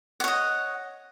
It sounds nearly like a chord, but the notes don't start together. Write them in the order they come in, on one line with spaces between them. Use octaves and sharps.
F#5 C#5 D#5